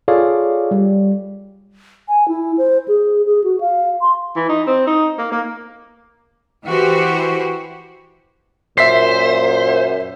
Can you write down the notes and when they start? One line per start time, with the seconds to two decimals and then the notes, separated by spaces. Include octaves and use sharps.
0.08 F4 G#4 A4 C#5 D5 F5
0.71 G3
2.08 G#5
2.28 E4
2.58 C5
2.88 G#4
3.26 G#4
3.44 F#4
3.60 F5
4.01 C6
4.36 E3
4.49 D#4
4.67 C4
4.87 D#4
5.18 A#3
5.32 A#3
6.65 E3 F#4 G4 C5
8.78 F#2 A#2 C5 E5 B6 C7